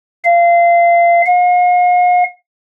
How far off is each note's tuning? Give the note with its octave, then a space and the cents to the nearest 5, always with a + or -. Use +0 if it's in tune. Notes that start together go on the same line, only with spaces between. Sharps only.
F5 -25
F5 +45